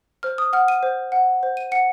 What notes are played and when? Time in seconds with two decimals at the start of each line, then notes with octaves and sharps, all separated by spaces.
0.23 C5 F6
0.38 D#6
0.53 F#5 F6
0.68 D#7
0.83 C5
1.12 F#5
1.43 C5
1.57 D#7
1.72 F#5 C#7